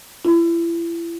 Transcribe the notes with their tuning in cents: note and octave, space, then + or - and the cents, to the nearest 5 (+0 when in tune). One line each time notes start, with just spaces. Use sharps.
E4 +35